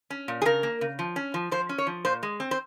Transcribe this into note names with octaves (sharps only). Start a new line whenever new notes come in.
C#4
A#2
G#4
C#3 A#4
A#3
C#3
F3
C#4
F3
F3 C5
C#4
C#5
F3
A#2 C5
G#3
C4
C5